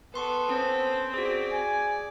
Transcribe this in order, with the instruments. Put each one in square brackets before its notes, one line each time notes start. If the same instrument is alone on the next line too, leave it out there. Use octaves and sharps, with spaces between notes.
[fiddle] B3 A4 [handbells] B4 C6 C#6
[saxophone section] C4 [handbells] C#4 [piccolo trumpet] C5
[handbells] F#4 G#4 [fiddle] D5
[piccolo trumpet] G#5